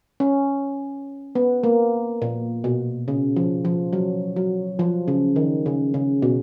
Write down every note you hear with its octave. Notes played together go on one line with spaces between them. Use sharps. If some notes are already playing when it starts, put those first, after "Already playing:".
C#4
B3
A#3
A#2
B2
C#3
F3
F3
F#3
F#3
F3
C#3
D#3
C#3
C#3
B2